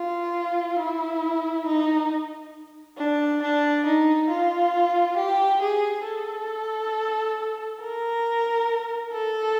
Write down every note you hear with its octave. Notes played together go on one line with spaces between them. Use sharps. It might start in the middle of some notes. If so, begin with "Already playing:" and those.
Already playing: F4
E4
D#4
D4
D4
D#4
F4
G4
G#4
A4
A#4
A4